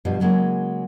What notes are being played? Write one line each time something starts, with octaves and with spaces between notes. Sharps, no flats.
G2 B2 F3 G3
C#3 F#3 G#3 A#3